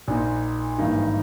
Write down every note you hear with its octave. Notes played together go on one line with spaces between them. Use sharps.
A#1 A#2 A#3 D#4
G#1 G2 E3 A#3 D#4